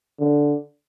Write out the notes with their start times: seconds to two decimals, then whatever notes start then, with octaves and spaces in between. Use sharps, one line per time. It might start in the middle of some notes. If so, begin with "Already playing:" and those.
0.19 D3